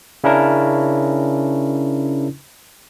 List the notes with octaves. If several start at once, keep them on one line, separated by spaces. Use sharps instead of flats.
C#3 C#4 D4 E4 A#4